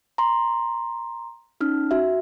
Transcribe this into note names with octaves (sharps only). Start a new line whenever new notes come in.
A#5 C6
C#4 D#4 F6
F#4 E5